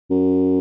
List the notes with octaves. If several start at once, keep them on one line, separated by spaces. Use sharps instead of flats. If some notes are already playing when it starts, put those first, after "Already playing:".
F#2